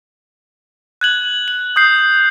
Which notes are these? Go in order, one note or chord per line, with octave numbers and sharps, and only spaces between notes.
F#6 G#6 F#7
F#7
D#6 G6 C7